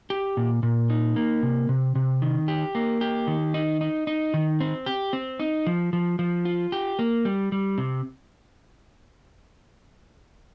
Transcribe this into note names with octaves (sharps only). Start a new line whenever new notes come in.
G4
A#2
A#2
D#4
A#3
C3
C3
C3
D#3
G4
A#3
G4
D#3
D#4
D#4
D#4
D#3
C4
G4
C4
D#4
F3
F3
F3
F4
G4
A#3
G3
G3
C3